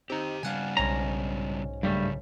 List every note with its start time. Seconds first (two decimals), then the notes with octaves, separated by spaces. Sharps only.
0.10 C4 D#4 G4 A#5
0.43 C#3 G3 D4 F5 F#5 G#5
0.77 B1 G#2 C#4 A#5
1.83 G2 C#3 F#3 G3 A3